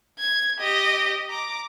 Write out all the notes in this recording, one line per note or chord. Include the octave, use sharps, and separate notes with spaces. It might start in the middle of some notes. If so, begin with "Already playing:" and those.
G#6
G4 D#5
A#5 D6